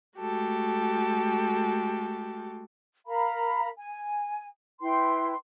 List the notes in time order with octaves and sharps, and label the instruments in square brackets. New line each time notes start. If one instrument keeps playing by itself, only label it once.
[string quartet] G#3 A3 F#4 G4 A4
[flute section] A#4 F5 A#5 B5
G#5
E4 B4 G5 C6